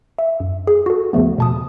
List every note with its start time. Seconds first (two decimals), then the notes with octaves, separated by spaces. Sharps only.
0.18 E5
0.40 F#2
0.67 G#4
0.86 F#4 A4
1.13 E2 C#3 F3 A3 B3
1.38 B2 A5 D#6